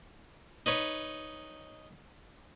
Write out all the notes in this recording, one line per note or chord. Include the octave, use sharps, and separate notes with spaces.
D#4 B4 C#5